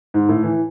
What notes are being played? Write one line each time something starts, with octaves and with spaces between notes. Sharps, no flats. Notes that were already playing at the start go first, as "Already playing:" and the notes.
G#2
A2
E3